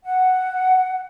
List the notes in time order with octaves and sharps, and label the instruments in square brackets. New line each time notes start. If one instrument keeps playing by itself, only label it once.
[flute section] F#5